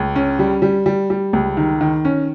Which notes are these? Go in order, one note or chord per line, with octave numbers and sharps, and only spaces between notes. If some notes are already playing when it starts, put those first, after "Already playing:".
Already playing: C#2
C#4
G3
G3
G3
G3
C#2
D#3
D#3
C#4